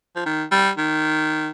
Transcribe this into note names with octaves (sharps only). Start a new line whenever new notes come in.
F3
D#3
G3
D#3